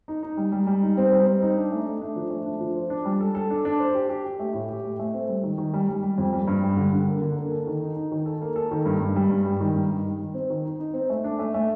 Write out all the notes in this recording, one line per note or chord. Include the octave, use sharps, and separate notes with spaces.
D#4
D#4
G3
G3
G3
D#4
C4
G3
C4
D#4
D4
A3
A3
D4
F3
A3
D4
F3
C5
D4
G3
A4
A4
D4
D4
C5
G4
G4
G4
A3
A2
G4
A3
A3
C4
G3
D#3
D#3
G3
G3
G3
F2
G3
G2
G3
D3
D3
A#3
D3
A#3
A4
D#3
D#4
D#4
D#3
A4
A#3
A4
D#3
G2
G2
G3
G2
G3
D#3
G2
G3
D#4
D#3
C4
D#3
D#4
D#4
C4
A3
D4
A3
A3